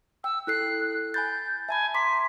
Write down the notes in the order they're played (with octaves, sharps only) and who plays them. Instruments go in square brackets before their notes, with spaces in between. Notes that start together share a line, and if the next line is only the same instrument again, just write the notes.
[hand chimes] G5 [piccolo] E6
[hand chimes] E4 A4 C7 [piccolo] F#6
[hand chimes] G#5 B5 A6 [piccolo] G6
[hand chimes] E5 A5 B5 [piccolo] G#5
[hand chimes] A#5 C6 D6 [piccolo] B6